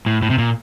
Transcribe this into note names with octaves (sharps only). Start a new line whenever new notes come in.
A2
A2
C3
A#2